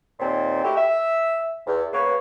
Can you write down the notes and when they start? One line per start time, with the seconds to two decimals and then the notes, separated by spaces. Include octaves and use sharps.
0.20 D#2 A#2 C4
0.64 A3 E4 F#4 G4
0.77 E5
1.66 E2
1.93 C#3 A#3 B3 B4 C#5